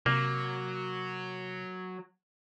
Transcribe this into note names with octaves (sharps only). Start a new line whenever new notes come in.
C3 F#3 A#3